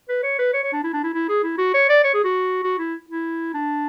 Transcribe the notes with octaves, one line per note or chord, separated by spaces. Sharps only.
B4
C#5
B4
C#5
C#5
D4
E4
D4
E4
E4
G#4
E4
F#4
C#5
D5
C#5
G#4
F#4
F#4
E4
E4
D4